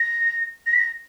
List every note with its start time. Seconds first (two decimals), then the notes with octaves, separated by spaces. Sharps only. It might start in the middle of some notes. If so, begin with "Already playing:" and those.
Already playing: A#6
0.66 A#6
0.73 B6
0.79 A#6